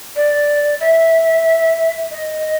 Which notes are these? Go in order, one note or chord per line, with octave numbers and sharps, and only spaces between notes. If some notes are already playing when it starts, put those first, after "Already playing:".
D5
E5
D#5